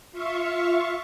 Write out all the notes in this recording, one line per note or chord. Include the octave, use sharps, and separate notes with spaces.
F4 E5 F5 C#6